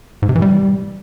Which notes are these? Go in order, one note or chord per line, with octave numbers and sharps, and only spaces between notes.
G#2
C3
E3
G3